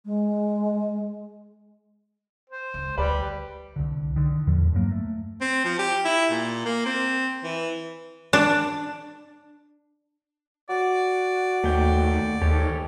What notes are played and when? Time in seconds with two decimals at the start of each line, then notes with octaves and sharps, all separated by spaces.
0.05 G#3
2.50 C5
2.74 C#2
2.98 D2 G3 B4 D5
3.76 C2 D3
4.16 D3 D#3
4.47 E2 A2 F3
4.73 G2 F#3 A#3
4.91 A3
5.41 C4
5.65 F3
5.79 G4
6.05 E4
6.31 A#2
6.65 A#3
6.86 C4
7.44 E3
8.33 D4
10.69 F#4 D5
11.64 D#2 A3 G5
12.42 D#2 G#2 G4 A4 C#5